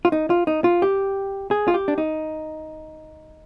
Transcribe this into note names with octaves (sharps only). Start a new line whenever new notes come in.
F4
D#4
F4
D#4
F4
G4
G#4
F4
G4
D4
D#4